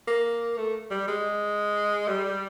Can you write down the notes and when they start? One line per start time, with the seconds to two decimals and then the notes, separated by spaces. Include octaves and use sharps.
0.07 A#3
0.57 A3
0.90 G3
1.08 G#3
2.08 G3